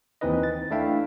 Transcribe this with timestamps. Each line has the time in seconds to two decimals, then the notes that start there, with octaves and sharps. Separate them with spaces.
0.21 D#2 E3 C4 D#4 B4 D#5
0.43 A6
0.71 A3 D4 E4 E5 F5 G5